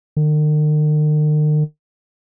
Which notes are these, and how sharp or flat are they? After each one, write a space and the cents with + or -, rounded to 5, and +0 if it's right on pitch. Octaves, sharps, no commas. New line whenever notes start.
D#3 -45